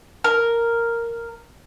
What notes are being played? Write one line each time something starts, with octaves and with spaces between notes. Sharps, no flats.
A#4